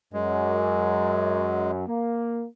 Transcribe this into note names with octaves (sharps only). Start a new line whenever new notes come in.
F#2 G#3
A#3